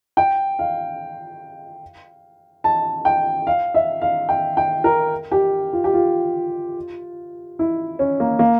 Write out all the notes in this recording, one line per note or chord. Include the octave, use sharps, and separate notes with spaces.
G5
F5
A5
G5
F5
E5
F5
G5
G5
A#4
G4
F4
G4
F4
E4
C#4
A#3
A#3